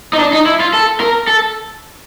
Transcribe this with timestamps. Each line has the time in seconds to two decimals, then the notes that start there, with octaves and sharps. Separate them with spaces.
0.13 D#4
0.19 D4
0.33 D#4
0.46 E4
0.60 F4
0.73 A4
1.00 A#4
1.27 A4